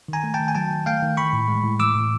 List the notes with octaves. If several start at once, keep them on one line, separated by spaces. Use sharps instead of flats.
D#3 G#5 A#5
A3
G5 A5
D#3
G#5
F#3 G5 A5
D#3
A3 F5 G5
D#3
E3 B5 C#6
A2
G#3
A2
E3 D6 E6
A2